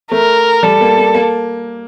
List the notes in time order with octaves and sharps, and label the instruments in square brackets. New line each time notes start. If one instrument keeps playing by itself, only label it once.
[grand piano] A3 [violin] A#4
[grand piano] G3 [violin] A4
[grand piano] A#3
A#3
A#3